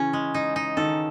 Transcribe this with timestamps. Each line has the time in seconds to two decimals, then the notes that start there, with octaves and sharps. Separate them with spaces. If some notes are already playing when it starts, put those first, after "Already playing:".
Already playing: C#3 E3 C#4
0.13 G#3
0.34 D#4
0.56 D#4
0.77 D#3 A4